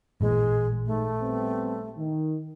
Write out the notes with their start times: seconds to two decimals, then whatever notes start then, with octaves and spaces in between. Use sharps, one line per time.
0.21 A1 A#2 E3 G#3
0.86 G#2 A3
1.21 G3 B3 C4
1.97 D#3